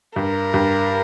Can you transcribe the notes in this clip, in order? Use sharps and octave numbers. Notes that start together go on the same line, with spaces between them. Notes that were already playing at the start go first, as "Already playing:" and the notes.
G2 A#4
G2